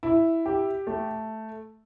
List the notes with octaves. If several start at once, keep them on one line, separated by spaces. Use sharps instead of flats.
E4
G4
A3